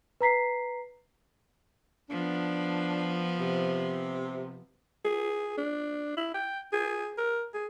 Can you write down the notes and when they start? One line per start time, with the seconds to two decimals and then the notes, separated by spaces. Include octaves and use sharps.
0.21 B4 A#5 B6 C7
2.10 F3 B3 D4
3.39 C3
5.05 G#4
5.58 D4
6.17 E4
6.34 G5
6.73 G#4
7.18 A#4
7.54 G#4